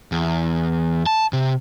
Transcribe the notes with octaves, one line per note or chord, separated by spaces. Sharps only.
E2
A5
C3